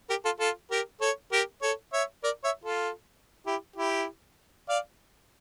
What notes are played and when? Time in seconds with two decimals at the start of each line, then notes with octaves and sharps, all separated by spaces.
0.09 G4 A#4
0.25 F4 A4
0.40 F4 A4
0.71 G4 A#4
1.01 A4 C#5
1.32 G4 A#4
1.62 A4 C#5
1.93 C#5 E5
2.23 A#4 D5
2.44 C#5 E5
2.64 F4 A4
3.46 E4 G4
3.76 E4 G4
4.69 D5 F5